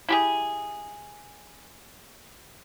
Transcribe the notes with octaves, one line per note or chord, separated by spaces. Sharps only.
E4 G4 G#4